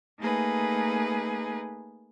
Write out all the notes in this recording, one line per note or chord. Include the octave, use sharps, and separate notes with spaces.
A3 A#3 D#4 G#4 B4